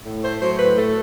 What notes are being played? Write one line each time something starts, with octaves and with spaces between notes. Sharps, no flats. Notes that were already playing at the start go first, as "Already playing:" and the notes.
A2
A3 C5
F#3 C5
A2 B4
A3 A4